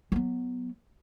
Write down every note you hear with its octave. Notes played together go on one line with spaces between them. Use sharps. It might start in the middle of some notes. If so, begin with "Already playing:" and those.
F#3 B3